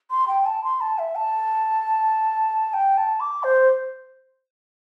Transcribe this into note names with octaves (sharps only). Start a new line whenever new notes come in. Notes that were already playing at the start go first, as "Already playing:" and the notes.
C6
G5
A5
C6
A5
E5
A5
G5
A5
D6
C5